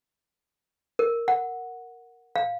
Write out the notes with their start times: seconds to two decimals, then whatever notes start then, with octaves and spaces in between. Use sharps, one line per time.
0.99 A#4
1.28 F#5
2.36 F5